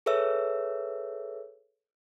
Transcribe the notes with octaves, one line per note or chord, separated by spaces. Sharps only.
G#4 A4 B4 C#5 E5 E6